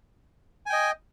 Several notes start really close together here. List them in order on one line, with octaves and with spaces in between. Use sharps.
G#5 G5 D#5